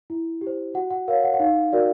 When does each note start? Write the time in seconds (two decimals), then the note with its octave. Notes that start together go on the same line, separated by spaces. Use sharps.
0.10 E4
0.41 G4
0.47 C5
0.74 F#4 F#5
0.91 F#5
1.08 A#4 C#5 F5
1.24 F#5
1.34 F#5
1.40 D#4 F5
1.72 F#4 A#4 D5